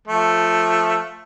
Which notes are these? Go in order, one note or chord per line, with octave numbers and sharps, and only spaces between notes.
F3 A3